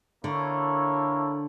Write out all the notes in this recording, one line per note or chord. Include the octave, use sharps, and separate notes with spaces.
D3 A#3 E4 A4 C#5